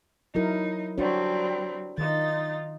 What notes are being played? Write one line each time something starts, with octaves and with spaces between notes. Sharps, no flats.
F#3 D#4 E4 A#4
F#3 G3 C4 D4 F#4 C#5
D#3 D#4 F4 A6